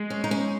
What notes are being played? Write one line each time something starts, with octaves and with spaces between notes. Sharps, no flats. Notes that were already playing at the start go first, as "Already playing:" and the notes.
Already playing: G#3
C#4
D#4
C#4